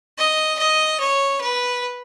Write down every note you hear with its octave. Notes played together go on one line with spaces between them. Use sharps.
D#5
D#5
C#5
B4